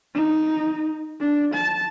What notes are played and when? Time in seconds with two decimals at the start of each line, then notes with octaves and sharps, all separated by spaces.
0.14 D#4
1.20 D4
1.54 A5